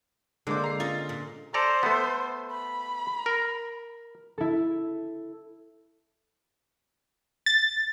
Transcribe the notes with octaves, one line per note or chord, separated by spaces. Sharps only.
D3 G#3 A#3 D4 C5 D6
A#5 C7
C#4 F4 D#5 A6
A#2
A4 C5 D5 A#5
A3 B3
B5
A#4
E4 A4
A6